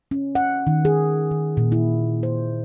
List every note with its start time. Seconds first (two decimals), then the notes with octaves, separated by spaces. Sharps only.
0.11 C#4
0.35 F#5
0.67 D#3
0.85 G#4
1.31 D#3
1.57 A#2
1.72 E4
2.23 C5